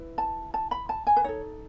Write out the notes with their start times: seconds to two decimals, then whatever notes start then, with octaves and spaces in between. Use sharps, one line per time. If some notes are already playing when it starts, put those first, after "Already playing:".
Already playing: E4 B4
0.18 A5
0.54 A5
0.71 B5
0.89 A5
1.07 G#5
1.17 B4
1.24 D#4 A4 C#5